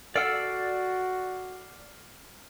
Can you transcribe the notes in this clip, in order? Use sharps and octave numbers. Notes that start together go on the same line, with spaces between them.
F#4 A4 D5 F#5 E6 F6 C7 D7